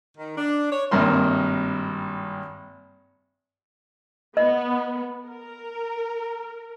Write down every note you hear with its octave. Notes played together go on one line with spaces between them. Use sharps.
D#3
D4
C#5
G#1 G2 C3 A#3 C6
B3 D#5
A#4